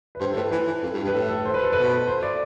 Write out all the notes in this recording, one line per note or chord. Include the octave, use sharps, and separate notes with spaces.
B4
G2 C5
A4
A2 B4
E3 B4
E3
F2
G2
G2
B4
A2 A4
A4
C5
B4
A4
B2 B4
C5
D5